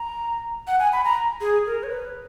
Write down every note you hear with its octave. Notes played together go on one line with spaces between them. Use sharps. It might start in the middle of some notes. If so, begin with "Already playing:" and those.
Already playing: A#5
F#5
G#5
B5
A#5
G#4
A#4
C#5
B4